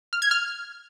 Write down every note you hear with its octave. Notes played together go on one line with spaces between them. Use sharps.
F6
G#6
F6